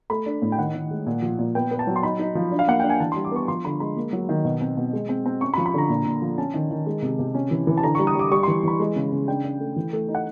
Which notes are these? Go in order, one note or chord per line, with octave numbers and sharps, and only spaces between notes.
A3 B5
D4
A2
G5
D#3 F#5
D#3
G#3
A#2
F3
A#2
B3 G5
B3
A5
F#3
C6
D#4 B5
D#4
F3
D4
F5
A#3 F#5
D4 G5
G#5
E3 A5
G3 C6
D6
B3 C#6
F3 C6
D3 B5
G#3 B5
A#3
F#3
D#3
B2
C4
B2
G#3
C4
C4
C#4 C#6
B5
F3
B5
D3 A#5
A#2
A#2
F3
C#4 A5
D#3
D#3
G#3
C3
C3
C#4
E3
E3
A5
D3 A#5
G3 C#6
D#6
G3 D6
G3 C#6
E3 C6
E3 B5
G#3
C#3
C#3
D4 G5
D4
A3
E3
A3
D#4
F#5